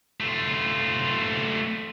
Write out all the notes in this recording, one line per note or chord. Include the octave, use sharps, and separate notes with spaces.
A3 F4